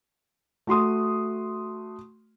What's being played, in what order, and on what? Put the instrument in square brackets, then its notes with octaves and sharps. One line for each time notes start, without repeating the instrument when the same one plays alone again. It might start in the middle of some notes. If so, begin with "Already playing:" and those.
[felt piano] A3 F#4 C6 D#6